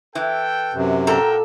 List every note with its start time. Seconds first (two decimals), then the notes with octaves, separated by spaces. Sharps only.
0.15 E3 A4 G5
0.74 F#2 C3
1.07 A#2 F#4 A4 A#4 G5 A#5